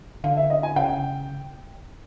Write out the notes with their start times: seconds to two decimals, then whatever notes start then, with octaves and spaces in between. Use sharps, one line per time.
0.24 D3 F5
0.37 E5
0.50 D#5
0.63 G#5
0.76 C#3 G5